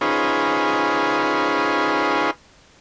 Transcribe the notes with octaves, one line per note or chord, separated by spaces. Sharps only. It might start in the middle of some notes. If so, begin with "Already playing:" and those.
C#4 D#4 F4 G#4 B4 C5